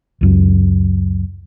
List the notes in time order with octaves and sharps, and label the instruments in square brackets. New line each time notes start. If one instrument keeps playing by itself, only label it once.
[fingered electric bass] C#2 F#2